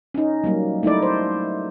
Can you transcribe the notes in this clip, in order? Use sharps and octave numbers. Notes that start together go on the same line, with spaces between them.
C#4 D#4
F#3 G3 A#3
A3 D#4 E4 D5
C5